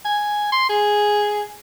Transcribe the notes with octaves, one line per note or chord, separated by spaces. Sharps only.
G#5
C6
G#4